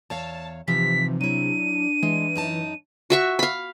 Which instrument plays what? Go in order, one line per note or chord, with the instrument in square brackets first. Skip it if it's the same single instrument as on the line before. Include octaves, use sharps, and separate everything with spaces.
[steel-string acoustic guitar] E2 C#5 F5 [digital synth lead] A5
[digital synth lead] C3 [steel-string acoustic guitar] E3 F3 D#4 [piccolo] B6
[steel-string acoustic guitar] F#3 E4 [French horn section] D4 [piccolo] D#7
[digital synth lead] E3 [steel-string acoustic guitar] G#3
[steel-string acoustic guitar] F#2 D#4 A5
[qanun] F#4 E5 C#6
F5 B5